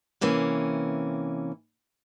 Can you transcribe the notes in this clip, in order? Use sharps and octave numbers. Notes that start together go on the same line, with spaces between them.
C3 E3 A#3 C#4